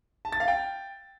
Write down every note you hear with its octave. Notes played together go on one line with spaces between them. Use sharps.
A5
A6
F5
G5